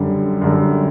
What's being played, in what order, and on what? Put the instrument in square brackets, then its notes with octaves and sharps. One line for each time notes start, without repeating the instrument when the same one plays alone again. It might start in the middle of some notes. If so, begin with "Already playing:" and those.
Already playing: [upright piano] F#2 D3 G3
F#2 D3 G3